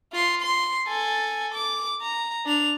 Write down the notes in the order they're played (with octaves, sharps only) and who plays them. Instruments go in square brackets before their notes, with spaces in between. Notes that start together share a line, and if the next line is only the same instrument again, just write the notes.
[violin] F4 C6
C6
A4 G#5
D6
A#5
D4 F7